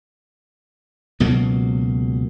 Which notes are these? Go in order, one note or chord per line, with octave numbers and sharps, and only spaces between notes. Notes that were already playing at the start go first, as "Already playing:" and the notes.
C#2 B2 F#3 A#3